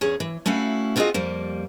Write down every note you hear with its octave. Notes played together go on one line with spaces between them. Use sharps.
E2 C#4 G#4
E3
A3 C#4 E4 F#4 F5
B3 C4 F4 F#4 G#4 D#5
F2 G3 A#3